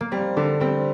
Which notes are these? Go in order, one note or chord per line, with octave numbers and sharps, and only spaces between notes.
A#3
G3 C4
D3 D4
G3 C4